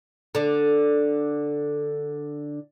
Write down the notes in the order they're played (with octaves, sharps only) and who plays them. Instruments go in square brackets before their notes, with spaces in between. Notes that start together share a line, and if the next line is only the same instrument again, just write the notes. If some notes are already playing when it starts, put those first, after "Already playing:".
[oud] D3 D4